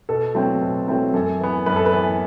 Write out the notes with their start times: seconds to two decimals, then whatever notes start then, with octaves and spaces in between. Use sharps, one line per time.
0.09 B2 A4
0.35 F#3 A3 C4
0.61 B2
0.88 F#3 A3 C4
1.14 F#2 A4
1.41 E3 B3
1.66 F#2 B4
1.76 A4
1.86 B4
1.93 E3 B3